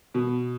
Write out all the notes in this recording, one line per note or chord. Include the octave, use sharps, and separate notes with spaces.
B2